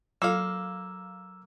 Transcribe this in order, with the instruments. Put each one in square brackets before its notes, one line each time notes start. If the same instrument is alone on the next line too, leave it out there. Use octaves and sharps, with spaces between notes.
[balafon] F#3 F4 A4 [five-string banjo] A#3 F5 [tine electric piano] E6